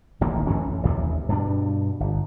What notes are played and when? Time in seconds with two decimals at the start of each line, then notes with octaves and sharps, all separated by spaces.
0.21 D1 A1 D#3 A#3
0.47 A1 F2 E3 C#4
0.83 A1 D#2 C3
1.29 G2 B2 D4
2.00 G1